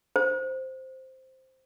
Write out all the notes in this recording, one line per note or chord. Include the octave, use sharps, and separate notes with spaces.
C5